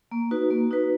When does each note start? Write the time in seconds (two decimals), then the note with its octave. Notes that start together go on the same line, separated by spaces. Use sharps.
0.11 A#3
0.31 D#4 F#4 B4
0.51 A#3
0.71 D#4 F#4 B4